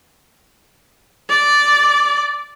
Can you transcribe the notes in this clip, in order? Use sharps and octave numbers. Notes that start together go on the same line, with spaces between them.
D5